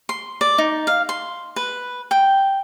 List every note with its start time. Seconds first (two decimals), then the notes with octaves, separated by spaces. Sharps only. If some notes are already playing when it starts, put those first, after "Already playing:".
0.09 C6
0.41 D5
0.58 D#4
0.87 F5
1.09 C6
1.56 B4
2.11 G5